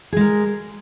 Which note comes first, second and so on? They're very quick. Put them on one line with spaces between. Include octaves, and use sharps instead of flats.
G#4 G#3 A#4